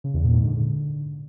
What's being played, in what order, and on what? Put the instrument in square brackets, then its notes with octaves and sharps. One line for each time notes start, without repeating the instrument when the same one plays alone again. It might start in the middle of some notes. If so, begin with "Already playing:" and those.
[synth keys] C#3
E2
A#2
G#2
D3